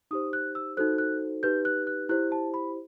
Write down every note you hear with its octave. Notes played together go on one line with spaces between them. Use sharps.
D#4 G4 C5 D#6
F#6
E6
D#4 F#4 A4 C5 F#6
F#6
D#4 G4 B4 G6
F#6
F#6
E4 G4 C5 F#6
A5
B5